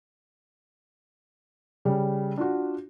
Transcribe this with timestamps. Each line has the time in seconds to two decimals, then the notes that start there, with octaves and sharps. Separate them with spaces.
1.85 C#3 G3
2.37 D4 F4 F#4